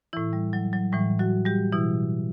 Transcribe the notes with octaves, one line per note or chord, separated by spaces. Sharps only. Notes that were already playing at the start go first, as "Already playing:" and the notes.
A2 E3 E4
G3
F#3
F#3
A2 E3 G3
F#3 F#4
G3 G4
B2 E3 E4